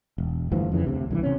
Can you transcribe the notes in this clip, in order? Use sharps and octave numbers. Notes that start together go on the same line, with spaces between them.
E1
D2 G2 E3 F3
F2 C#3 E3
D2 C3
C2 D#3 E3
C3 C#4